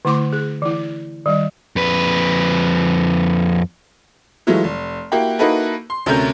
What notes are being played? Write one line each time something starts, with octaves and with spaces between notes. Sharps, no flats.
D3 A3 E4 C6 D6
G#4
E3 E4
D#3 G3 D#5
F2 B4
E3 F#3 G#3 A3 F4
F1
A#3 E4 F#4 G4
A#3 D#4 E4 F#4 A4 B4
C6
D2 C3 A3 C#4 A#4 G6